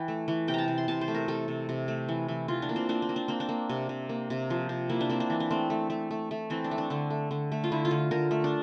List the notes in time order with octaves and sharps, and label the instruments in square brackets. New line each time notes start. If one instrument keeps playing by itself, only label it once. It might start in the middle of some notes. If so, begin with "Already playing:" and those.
Already playing: [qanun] E3 G5
A3
E3
C3 G5
A5 A#5
C3
C6
C3 A5
C5
A3
A#4
C3 A4
C3
C3
A3
E3
E3
E3 F4
D4
A#3
C4
A#3 D4
C4
A#3
D4
A#3 C4
D4
A#3
C3
C3
A#3
C3
F3
C3
A#3 E4
D4
A#3 C4
D4
E3
D4
A3 C4
A3
A3
A3
A3
E3 C4
D4
A3
D4
D3 D4
A3
D3
A3
F4
D3 E4
F4
D3
D3 A#4
A3
D4